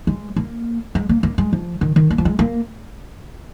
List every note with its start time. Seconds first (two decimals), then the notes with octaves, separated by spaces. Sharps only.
0.07 G#3
0.36 A#3
0.95 G#3
1.09 A#3
1.23 A#3
1.38 G#3
1.53 F3
1.81 D#3
1.96 D#3
2.10 A#3
2.18 F3
2.25 G#3
2.39 A#3